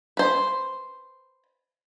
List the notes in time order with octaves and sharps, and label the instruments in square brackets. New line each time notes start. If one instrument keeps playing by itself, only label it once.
[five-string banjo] B4 C5